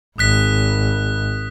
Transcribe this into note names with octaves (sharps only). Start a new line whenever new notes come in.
G#1 D#6 F#6 B6